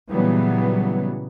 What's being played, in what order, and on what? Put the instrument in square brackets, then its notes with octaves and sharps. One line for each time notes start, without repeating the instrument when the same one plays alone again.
[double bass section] A#2 C#3 E3 F#3 G3 B3